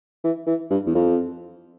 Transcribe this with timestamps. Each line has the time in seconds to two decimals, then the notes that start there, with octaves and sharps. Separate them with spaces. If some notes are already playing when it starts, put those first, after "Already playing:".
0.24 E3
0.47 E3
0.70 G2
0.87 E2
0.95 F2